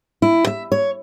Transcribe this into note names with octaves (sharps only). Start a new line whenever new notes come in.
E4
E5
C#5